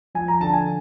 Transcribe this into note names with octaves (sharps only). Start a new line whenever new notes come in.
F3 G#5
A#5
D3 A5
G#5